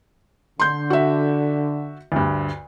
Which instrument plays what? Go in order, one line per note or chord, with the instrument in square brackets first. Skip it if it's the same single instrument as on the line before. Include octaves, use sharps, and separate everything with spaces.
[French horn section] D3 [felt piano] C6 G6
[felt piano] F#4 E5
D2 G2